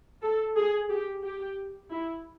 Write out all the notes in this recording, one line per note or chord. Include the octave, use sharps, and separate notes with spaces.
A4
G#4
G4
G4
E4